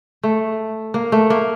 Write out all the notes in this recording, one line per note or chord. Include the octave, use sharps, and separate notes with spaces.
A3
A#3
A3
A#3